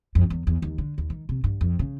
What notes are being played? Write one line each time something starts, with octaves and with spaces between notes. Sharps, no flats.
F2
E2
E2
D#2
D3
D#2
D#3
C3
G2
F2
C#3